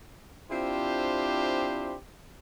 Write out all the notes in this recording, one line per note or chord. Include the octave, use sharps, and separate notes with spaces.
C4 D4 E4 F4 G4 C5